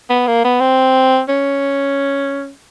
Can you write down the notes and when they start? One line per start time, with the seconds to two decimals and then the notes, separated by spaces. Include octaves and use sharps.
0.10 B3
0.27 A#3
0.44 B3
0.61 C4
1.29 C#4